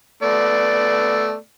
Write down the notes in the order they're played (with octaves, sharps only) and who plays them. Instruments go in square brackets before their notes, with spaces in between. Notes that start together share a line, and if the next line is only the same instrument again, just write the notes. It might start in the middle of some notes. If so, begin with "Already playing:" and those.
[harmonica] A3 B3 D5